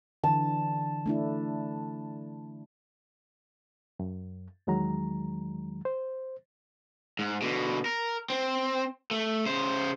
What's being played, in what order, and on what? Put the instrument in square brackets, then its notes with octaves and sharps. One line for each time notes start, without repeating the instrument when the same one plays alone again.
[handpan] D3 E3 [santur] A5
[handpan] A3 D4 E4
[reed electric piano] F#2
E2 D#3 F#3 G#3 A#5
C5
[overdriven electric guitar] G#2
B2 D3
A#4
C4
A3
C#3 C5